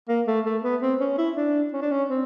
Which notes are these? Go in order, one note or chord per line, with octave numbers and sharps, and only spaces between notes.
A#3
A3
A3
B3
C4
C#4
E4
D4
C#4
D4
C#4
C4